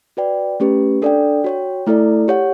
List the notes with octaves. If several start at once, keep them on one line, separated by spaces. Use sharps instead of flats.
F#4 B4 D5 G5
A3 C#4 G4 B4
D4 A4 D5 G5
F#4 C#5 G5
A3 E4 A4 D5
G4 C#5 F#5